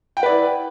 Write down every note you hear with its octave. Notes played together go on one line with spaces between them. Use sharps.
E4 B4 D5 F#5 G5